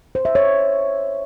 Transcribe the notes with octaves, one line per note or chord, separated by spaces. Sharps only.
C5
E5
C#5